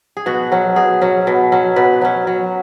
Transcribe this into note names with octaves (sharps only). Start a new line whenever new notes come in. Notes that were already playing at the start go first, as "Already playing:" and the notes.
G#4
B2 F#4
F#3 C#4
B2 G#4
F#3 C#4
B2
F#3 C#4
B2 B4
F#3 C#4
F#3